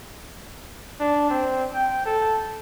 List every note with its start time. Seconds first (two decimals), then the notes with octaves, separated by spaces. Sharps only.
1.00 D4
1.30 C4
1.74 G5
2.06 A4